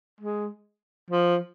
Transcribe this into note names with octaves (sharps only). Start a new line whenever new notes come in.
G#3
F3